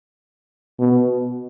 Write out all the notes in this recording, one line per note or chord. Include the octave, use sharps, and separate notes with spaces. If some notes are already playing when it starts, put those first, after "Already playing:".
B2